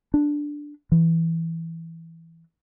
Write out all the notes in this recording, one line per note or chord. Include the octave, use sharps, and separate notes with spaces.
D4
E3